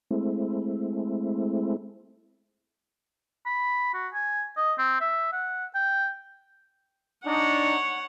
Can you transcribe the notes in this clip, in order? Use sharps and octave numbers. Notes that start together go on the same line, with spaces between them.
G#3 A3 C4 E4
B5
F#4
G#5
D#5
C4
E5
F#5
G5
D4 D#4 C#5 F#5